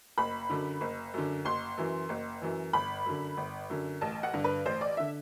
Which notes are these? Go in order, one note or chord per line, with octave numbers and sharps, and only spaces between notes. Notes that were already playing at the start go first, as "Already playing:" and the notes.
F#1 B5
F#2 D3
F#1
F#2 D3
F#1 C6
F#2 E3
F#1
F#2 E3
G1 B5
F#2 D3
G1
F#2 D3
A1 A5
F#5
G2 D3
B4
A1 C5
D5
D3 E5